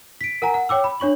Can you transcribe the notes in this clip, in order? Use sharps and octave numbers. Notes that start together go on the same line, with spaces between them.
B6 D7
A#4 F#5 G#5 A#5
F#5
C#5 G5 D6 E6
B5
D4 C#5 C#6 F#7